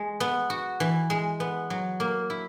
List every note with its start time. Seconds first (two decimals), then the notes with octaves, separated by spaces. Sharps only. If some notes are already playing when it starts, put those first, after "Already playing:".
Already playing: G#3
0.20 B3
0.50 F#4
0.80 E3
1.10 G#3
1.40 B3
1.70 F#3
2.00 A#3
2.30 E4